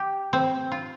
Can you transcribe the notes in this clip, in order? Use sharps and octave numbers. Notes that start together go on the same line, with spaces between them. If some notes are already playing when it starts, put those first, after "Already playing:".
Already playing: G4
C4
F4